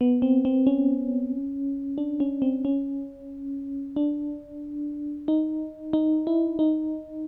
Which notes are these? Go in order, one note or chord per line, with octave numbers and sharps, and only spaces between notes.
B3
C4
C4
C#4
D4
C#4
C4
C#4
D4
D#4
D#4
E4
D#4